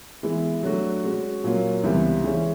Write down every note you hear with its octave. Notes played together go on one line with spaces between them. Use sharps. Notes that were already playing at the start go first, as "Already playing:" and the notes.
E3 G#3 B3 E4
F#3 A3 D4 F#4
G#3 C#4 F#4
A#2 F#3 A#3
C#2 C3 E3 G3 B3
E3 G#3 C#4